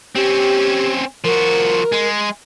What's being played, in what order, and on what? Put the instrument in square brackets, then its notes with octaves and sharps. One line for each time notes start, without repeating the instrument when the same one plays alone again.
[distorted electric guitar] C4 C#4 [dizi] G4
[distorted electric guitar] F3 F#4 [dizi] A#4
[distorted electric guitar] G#3